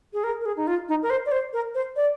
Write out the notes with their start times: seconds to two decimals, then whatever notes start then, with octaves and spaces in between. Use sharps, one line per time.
0.13 G#4
0.24 A#4
0.41 A#4
0.46 G#4
0.57 D#4
0.67 F4
0.89 D#4
1.03 A#4
1.10 C5
1.26 D5
1.32 C5
1.53 A#4
1.75 C5
1.96 D5